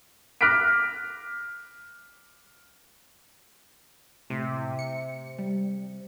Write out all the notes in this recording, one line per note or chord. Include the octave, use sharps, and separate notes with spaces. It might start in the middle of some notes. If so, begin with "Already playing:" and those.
D6 F6 F#6 A#6 B6 D7
A2 C3
C#7
G3